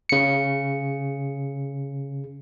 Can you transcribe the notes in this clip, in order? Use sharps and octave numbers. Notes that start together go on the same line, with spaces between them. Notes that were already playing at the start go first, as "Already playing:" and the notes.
C#3 C#7